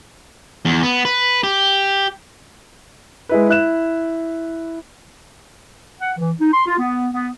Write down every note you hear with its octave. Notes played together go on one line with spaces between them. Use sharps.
E2
B3
B4
G4
G#3 E4 B4
E4 F#6 E7
F#5
E3
D#4
C6
F4
B3
B3